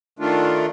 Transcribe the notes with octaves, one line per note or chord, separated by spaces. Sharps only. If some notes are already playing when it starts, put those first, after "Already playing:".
D#3 A3 D4 F4